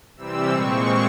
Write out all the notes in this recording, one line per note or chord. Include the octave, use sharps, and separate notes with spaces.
C3 E3 G3 C4 E6
A#2 G#3 C4 C#6